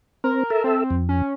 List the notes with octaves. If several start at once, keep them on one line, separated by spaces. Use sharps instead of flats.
C4 A#4
A4 E5
C4
F2
C#4